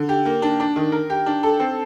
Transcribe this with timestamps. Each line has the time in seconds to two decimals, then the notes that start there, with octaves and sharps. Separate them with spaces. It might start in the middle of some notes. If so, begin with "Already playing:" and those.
Already playing: D3
0.09 G4
0.25 A#3
0.42 D4
0.60 D4
0.76 D#3
0.92 A#4
1.10 G4
1.26 D4
1.43 A4
1.60 C4